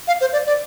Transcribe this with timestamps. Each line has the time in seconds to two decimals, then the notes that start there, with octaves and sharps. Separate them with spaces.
0.08 F5
0.21 C5
0.33 D5
0.46 D5